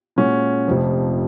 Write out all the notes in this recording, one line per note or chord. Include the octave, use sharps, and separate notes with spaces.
A#2 G#3 C#4 F#4
F1 F2 C3 F3